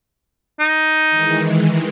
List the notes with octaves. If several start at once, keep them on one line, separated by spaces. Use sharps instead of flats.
D#4
D#3 E3 G#3